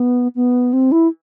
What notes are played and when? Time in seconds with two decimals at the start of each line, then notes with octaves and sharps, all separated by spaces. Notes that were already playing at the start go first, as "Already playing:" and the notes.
Already playing: B3
0.36 B3
0.73 C4
0.92 E4